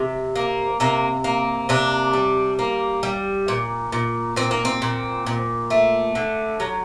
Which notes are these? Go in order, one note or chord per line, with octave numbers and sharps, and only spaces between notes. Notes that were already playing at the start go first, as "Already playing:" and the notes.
Already playing: C3
A#3
C3 A#3
A#3
C3 D4
G3
A#3
G3
A#2
A#2
A#2 C4
A#3
C4
A#2
A#2
A3
D3
F#3